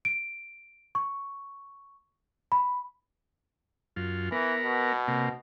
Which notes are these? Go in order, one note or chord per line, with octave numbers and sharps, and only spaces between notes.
D7
C#6
B5
F#2 F4
E3 B3 A#4
B2
C3 A#3